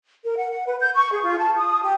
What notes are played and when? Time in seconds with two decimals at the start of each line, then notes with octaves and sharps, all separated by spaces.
0.24 A#4
0.36 F#5
0.51 F#5
0.65 B4
0.79 G6
0.94 C#6
1.11 G#4
1.23 F4
1.38 A5
1.56 D#6
1.81 G4